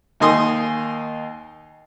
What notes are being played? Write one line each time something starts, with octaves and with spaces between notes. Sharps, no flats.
D#2 A#3 D#4 G#5 C6 D#6